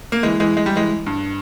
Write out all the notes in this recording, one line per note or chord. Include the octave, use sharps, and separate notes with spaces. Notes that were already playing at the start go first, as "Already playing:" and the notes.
A#3
E3 G#3
E3 G#3
G#3
G3
E3 G#3
G2